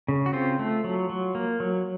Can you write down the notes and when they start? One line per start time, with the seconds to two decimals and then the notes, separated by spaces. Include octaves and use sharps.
0.08 C#3
0.26 F#4
0.33 C4 F4
0.59 A3
0.84 F#3
1.10 F#3
1.35 A#3
1.60 F#3